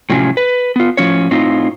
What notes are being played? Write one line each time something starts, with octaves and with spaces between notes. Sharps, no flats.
A2 C3 F3 F#3 C#4
B4
B3 F4
A2 F3 C#4 C#5
A2 C4 D#4 F4